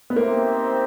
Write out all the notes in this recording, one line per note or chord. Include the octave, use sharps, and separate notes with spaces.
B3
A#3 C4 D#4 G4 C5 E5